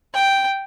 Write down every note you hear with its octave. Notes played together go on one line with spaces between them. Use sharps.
G5